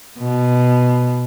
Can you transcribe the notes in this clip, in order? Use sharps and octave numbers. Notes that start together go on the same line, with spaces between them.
B2